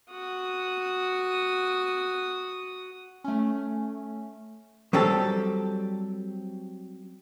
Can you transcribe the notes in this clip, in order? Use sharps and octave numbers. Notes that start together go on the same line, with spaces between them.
F#4 D#6
A3 C#4
F#3 G3 C4 G4 A4